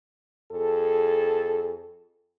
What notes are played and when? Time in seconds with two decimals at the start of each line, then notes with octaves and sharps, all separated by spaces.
0.52 F2 G#4 A4